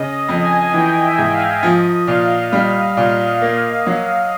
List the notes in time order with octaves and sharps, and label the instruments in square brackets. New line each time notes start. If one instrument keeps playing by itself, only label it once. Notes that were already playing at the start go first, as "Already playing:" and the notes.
Already playing: [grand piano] C#3 [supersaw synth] D#5
[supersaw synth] D#5
[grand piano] F2
[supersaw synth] G#5
[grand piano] E3 [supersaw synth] G5
[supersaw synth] E5
[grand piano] G#2
[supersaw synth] F5
[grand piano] F3 [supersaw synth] D#5
[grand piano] A#2 [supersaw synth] F5
[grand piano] G3
A#2
A#3
F#3